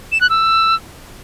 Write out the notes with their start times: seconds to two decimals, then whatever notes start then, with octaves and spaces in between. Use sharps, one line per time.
0.12 E7
0.21 F#6
0.30 E6